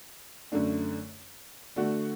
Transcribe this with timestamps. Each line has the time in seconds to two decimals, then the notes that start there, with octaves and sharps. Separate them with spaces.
0.52 F#2 D3 A3 D4
1.76 D3 A3 D4 F#4